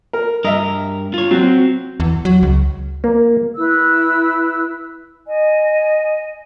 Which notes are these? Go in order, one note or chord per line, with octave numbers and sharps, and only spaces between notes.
A#4
G2 A#4 D#5 E5
F4 C#5
F#3 C4 F#4
E2
F#3
C#2
A#3
E4 B4 E6
D#5 G#5